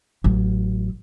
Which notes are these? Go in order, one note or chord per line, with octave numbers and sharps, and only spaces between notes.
A1 F#3